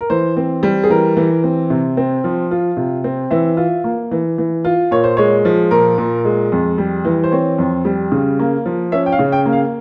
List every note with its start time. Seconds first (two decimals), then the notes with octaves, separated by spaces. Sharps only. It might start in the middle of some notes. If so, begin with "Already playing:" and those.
0.01 A#4
0.10 E3 C5
0.37 C4
0.63 G3
0.84 G#4
0.90 E3 A#4
1.17 E3
1.44 C4
1.70 C3
1.97 C4
2.24 F3
2.51 F4
2.77 C3
3.04 C4
3.31 E3 E5
3.57 F4
3.84 A#3
4.11 E3
4.38 E3
4.65 F4
4.91 A#2 C#5
5.04 C5
5.17 G#3 C#5
5.45 F3
5.71 A#2 A#4
5.98 A#2
6.25 G#3
6.52 F2
6.78 G3
7.05 E3
7.24 C5
7.31 C4 C#5
7.59 F2
7.85 G3
8.12 C#3
8.39 A#3
8.66 F3
8.92 C#4 E5
9.06 G5
9.12 F5
9.19 C#3
9.32 G5
9.46 A#3
9.53 F5